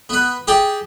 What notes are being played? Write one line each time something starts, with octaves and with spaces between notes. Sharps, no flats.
B3 B4
G4 G#4 G5 A5